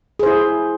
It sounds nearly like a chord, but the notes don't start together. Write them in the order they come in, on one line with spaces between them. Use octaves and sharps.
G#4 C5 E4